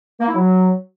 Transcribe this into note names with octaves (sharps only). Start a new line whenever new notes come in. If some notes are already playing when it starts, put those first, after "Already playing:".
A#3
E4
F#3